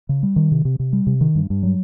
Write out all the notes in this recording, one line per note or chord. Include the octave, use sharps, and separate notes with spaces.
C#3
G3
D#3
C3
C3
C3
G3
C3
D#3
G2
G2
F#3